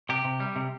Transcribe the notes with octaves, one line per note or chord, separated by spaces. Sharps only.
C3 G4
C3
G3
C3